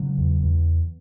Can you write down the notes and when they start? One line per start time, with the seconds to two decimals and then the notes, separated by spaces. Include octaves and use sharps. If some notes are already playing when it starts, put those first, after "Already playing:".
Already playing: C#3 F#3
0.18 E2
0.42 E2